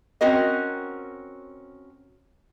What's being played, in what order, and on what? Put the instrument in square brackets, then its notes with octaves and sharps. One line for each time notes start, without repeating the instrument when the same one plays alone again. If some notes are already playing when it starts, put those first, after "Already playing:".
[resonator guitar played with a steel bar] C4 C#4 F#4 A#4 D#5